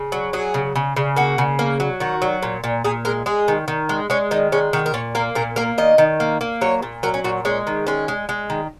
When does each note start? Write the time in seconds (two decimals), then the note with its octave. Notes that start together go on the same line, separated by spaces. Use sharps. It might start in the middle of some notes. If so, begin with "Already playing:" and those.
Already playing: C#3
0.12 F#3
0.33 F#3 G#4
0.54 C#3
0.75 C#3
0.96 C#3
1.16 A#3 F#4
1.38 C#3
1.59 A#3
1.80 F#3
2.00 D#3 F#4
2.22 F#3
2.43 A#2
2.64 A#2
2.84 A#2 G#4
3.05 G#3 A#4
3.26 G#3 G#4
3.48 D#3
3.68 D#3
3.89 G#3
4.10 G#3 C#4
4.31 D#3 D#4
4.52 G#3 C#4
4.73 D#3 F#4
4.86 A#4
4.94 A#2 C#5
5.15 A#3 A#4
5.35 A#2 A#4
5.56 A#3 A#4
5.78 D#3 D#5
5.98 D#3
6.20 A#3
6.41 A#3
6.61 F#3 C#5
6.82 A#2
7.03 F#3 A#4
7.14 C#4
7.24 A#2 F#4
7.45 G#3 C#4
7.67 D#3
7.87 G#3 C#4
8.08 G#3
8.29 G#3
8.50 D#3